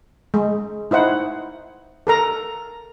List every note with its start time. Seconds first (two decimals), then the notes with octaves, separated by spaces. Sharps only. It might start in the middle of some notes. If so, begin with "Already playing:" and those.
0.34 G#3
0.91 D#4 E4 C5 F#5
2.07 A4 A#4 A#5